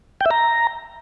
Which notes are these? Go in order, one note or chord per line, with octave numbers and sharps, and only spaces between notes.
G5
E5
A#5